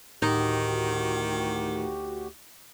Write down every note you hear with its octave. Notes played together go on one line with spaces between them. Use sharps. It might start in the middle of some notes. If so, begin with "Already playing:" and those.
D2 A2 D#3 D#4 F#4 G4